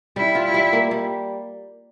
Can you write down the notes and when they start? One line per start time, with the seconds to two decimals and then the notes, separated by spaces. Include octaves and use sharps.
0.16 G3 E4
0.35 F4
0.45 E4
0.54 G3
0.73 A#3
0.91 G3